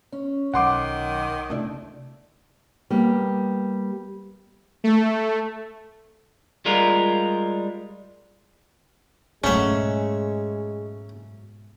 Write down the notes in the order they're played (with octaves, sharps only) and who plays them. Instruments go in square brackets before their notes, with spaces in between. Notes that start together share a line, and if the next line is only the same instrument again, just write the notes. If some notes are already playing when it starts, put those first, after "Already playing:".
[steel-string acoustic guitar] C#4
[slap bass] B1 F#3 [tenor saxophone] D#3 [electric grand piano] F#5 C6 D6
[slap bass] C3 D4 [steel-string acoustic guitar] A3 E4 D5
[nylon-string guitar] G3 A#3 B3
[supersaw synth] A3
[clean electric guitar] G3 G#3 F4 A#4
[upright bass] G#2 B2 [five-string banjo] F#3 A3 [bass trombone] G#3 [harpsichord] C#4 E5